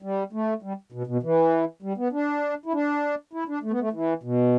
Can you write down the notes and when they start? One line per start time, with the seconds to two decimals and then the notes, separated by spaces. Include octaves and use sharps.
0.02 G3
0.33 A3
0.63 G3
0.92 B2
1.07 B2
1.23 E3
1.82 G3
1.98 B3
2.12 D4
2.66 E4
2.73 D4
3.33 E4
3.48 D4
3.63 A3
3.71 B3
3.80 A3
3.93 E3
4.23 B2